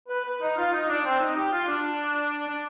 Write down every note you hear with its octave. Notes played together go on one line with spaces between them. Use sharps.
B4
B4
D#4
F4
D#4
D4
C4
D#4
G4
F4
D4
D4